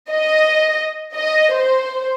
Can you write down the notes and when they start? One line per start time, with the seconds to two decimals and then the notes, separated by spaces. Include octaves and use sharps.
0.10 D#5
1.14 D#5
1.53 C5